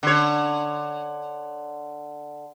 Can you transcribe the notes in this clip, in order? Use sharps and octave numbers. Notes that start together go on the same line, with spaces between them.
D3 C#5